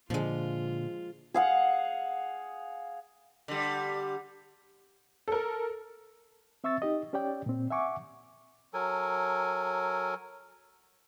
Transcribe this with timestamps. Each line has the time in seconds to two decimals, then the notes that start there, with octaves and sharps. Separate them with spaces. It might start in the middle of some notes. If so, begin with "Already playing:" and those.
0.10 A#2 D3 F3 G#3 F4
1.34 G#4 F5 F#5
3.48 D3 G3
5.28 A4 A#4
6.64 C4 E5 C#6 E6 A6
6.82 D#4 G4 D#5
7.13 C#4 G4 C#5 D5 G5
7.46 A#2 C4
7.71 E5 F#5 G#5 C#6 D6
8.74 F#3 A4 A#4 G#5